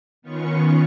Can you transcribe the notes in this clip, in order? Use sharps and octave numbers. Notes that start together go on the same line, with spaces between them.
D#3 B3 C#4 F4 C#6